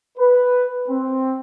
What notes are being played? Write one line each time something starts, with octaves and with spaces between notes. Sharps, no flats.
B4
C4